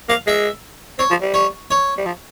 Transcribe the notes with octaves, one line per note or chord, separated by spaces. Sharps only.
A#3 F5
G#3 E5
C4 C#5
F3
G3
C#5
C#5
G3
F3